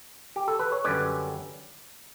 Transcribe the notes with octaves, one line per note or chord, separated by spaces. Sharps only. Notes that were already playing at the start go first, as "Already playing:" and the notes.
G4
A4
B4
C#5
F#2 D3 G3 C#4 B4 D5